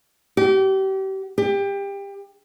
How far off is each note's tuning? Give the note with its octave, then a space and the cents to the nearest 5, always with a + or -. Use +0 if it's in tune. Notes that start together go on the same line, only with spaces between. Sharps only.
G4 -35
G4 +25